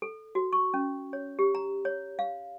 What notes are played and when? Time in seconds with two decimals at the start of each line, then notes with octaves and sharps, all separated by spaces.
0.02 A4
0.35 F#4
0.53 C#6
0.74 C#4
1.13 C#5
1.39 G4
1.55 A#5
1.85 C#5
2.19 F5